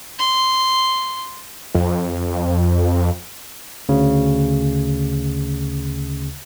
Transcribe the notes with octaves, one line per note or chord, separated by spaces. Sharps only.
C6
F2
D2 C#3